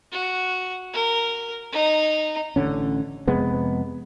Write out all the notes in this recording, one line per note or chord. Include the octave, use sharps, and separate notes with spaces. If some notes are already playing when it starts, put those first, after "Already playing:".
F#4
A#4
D#4 A#5
A1 D3 C#4
F2 C3 G#3 B3